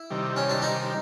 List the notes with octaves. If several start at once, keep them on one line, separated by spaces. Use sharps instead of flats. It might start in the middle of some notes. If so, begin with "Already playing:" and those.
Already playing: E4
C3 D#3 G3
C#4
D4
D#4